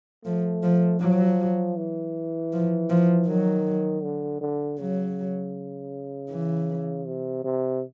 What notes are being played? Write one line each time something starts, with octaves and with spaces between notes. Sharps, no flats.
F3 A3
F3
F3 F#3
E3
F3
F3
D#3 F#3
D3
D3
C#3 F#3
E3
C3
C3